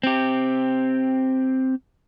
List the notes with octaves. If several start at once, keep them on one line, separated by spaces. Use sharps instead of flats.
C4 G4